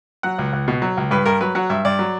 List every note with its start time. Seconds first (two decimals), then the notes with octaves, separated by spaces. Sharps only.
0.23 F#3 F#5
0.39 C#2
0.53 C#2
0.68 B2
0.82 F#3
0.97 C#2
1.11 G2 B4
1.26 G2 A#4
1.41 F#3 B4
1.55 F#3 F#5
1.70 G2 E5
1.85 G2 D5
1.99 F#3